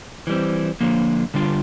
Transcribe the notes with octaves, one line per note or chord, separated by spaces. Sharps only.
E3 G3 C4
D3 F3 A#3
D3 G3 D4 F4